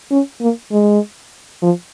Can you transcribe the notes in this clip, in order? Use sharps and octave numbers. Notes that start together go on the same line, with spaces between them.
C#4
A#3
G#3
F3